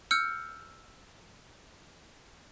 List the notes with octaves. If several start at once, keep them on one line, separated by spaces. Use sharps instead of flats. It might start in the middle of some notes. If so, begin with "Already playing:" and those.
E6 F6 G6 C#7